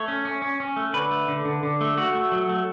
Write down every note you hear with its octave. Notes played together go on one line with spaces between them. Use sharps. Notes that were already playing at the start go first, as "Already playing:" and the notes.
Already playing: A3 C#5
C#4
C#4
C#4
C#4
A3
D3 B4
A3
D3
D3
D3
A3
A3 F#4
A3
F#3
A3